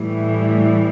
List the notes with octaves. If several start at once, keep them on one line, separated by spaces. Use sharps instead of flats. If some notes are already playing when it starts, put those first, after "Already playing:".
Already playing: A2 E3 G3